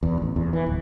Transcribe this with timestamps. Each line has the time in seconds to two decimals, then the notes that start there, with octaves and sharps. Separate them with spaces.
0.03 E2
0.22 A1
0.36 E2
0.53 E3
0.66 D1